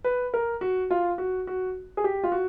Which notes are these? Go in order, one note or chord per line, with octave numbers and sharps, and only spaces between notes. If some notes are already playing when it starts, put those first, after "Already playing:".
B4
A#4
F#4
F4
F#4
F#4
G#4
G4
F4
F#4